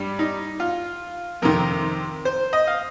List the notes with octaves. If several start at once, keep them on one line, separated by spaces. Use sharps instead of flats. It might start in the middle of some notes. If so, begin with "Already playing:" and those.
Already playing: G2 G3
D#4
F4
F2 C3 D#3 A#4
C5
D#5
F5